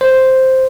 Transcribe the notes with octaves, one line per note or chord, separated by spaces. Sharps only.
C5